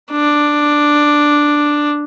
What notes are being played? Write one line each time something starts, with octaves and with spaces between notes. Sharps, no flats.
D4